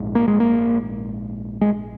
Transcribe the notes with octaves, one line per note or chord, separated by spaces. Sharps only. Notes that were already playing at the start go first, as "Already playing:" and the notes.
Already playing: A#1 G#2
A#3
G#3
A#3
G#3